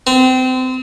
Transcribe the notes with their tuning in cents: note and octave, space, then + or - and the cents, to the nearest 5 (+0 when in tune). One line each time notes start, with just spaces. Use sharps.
C4 -30